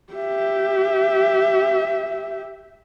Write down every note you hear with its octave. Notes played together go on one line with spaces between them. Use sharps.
G4 E5